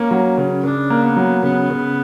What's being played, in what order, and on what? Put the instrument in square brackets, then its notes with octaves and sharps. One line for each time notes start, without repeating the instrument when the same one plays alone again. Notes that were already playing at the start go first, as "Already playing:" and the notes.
Already playing: [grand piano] A#3 [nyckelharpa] C#4
[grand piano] F#3
C#3
[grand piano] C#3 [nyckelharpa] D4
[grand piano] A#3
[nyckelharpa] B3
[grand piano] F#3
[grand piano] C#3 [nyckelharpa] B3
[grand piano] C#3